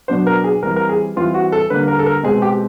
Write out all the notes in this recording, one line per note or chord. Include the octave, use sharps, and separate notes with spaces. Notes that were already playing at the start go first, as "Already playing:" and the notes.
B2 F#3 B3 D4 C5
A#4
G#4
E3 G3 C4 A#4
A#4
G#4
E3 G3 C4 F4
F#4
A4
D3 G3 A#3 B4
A#4
A4
A#4
B2 G#3 C4 G#4
G4